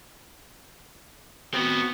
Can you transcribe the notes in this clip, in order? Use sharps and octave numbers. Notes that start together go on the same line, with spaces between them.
B3 C4 F#4